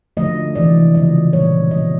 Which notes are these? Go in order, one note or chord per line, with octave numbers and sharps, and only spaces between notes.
D3 F3 A3 D#5
C3 E3 G#3 D5
C#3 F3 G#3 D#5
A#2 G3 A#3 C#5
B2 G#3 D#5